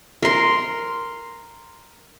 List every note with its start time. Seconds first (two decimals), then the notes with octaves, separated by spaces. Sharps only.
0.23 A#4 C6